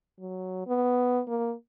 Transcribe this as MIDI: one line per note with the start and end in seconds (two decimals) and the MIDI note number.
0.20 0.67 54
0.67 1.21 59
1.28 1.53 58